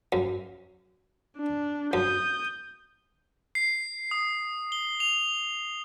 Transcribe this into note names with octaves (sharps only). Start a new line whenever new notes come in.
F#2
D4
F#2 D#6 G6
C7
D#6
G7
F7